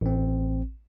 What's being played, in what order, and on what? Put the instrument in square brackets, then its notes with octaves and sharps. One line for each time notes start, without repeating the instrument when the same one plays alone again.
[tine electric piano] A1 C4